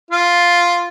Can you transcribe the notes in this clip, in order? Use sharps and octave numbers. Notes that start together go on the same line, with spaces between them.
F4